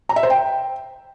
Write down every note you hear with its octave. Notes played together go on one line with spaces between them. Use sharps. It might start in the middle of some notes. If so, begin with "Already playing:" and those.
A#5
E5
C5
G5